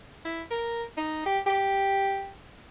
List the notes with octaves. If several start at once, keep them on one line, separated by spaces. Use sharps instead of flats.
E4
A#4
D#4
G4
G4